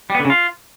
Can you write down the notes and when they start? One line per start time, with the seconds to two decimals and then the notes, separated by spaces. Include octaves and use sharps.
0.10 G3
0.15 B3
0.20 D3
0.25 C#3
0.30 F4